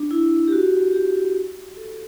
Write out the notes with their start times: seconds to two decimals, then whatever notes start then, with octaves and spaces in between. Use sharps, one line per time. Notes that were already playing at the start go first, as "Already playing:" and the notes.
Already playing: D4
0.11 E4
0.48 G4
0.52 F#4
0.88 F#4
0.93 G4
1.77 A4